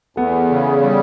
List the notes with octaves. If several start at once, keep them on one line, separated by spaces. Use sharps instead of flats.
E2 A3 B3
C#3
G3